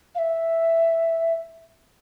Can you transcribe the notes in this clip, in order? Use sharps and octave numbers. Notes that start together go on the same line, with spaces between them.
F5
E5